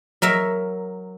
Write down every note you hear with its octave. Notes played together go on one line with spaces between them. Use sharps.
F#3 A#4 E5